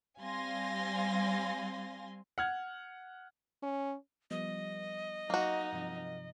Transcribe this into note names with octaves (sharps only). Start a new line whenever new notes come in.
G3 C4 F5 G#5 C6 A#6
F#5 F6 G#6
C#4
F3 G3 B3 D#5
F#3 A#3 D#4 F#4
G2 C3 F3